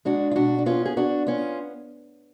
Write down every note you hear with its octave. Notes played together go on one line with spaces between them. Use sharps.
G#3 D4 F#4
F4
B2 D4 F#4
D4
B3 C#4 F4
G#4
B3 D4 F#4
B3 C#4 F4